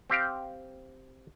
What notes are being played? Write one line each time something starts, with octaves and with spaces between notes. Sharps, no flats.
C4 G4 F5 G5